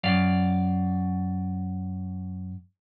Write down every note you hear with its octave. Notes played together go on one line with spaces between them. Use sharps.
F#2 D5 F5